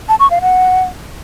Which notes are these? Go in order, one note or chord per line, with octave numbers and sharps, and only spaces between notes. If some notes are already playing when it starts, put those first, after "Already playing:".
A5
C#6
F5
F#5